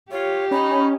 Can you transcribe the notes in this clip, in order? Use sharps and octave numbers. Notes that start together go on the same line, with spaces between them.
F4 G4 C#5
C#4 D#4 B5